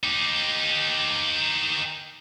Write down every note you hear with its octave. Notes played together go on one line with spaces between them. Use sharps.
D#4 G4